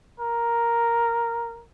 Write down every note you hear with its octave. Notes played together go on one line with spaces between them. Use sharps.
A#4